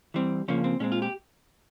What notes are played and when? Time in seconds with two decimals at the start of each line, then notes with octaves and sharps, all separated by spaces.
0.14 E3 G3 C4
0.48 C#3 F3 A#3 C#4
0.64 C4
0.80 A#2 G#3 C4 C#4
0.92 F4
1.02 G4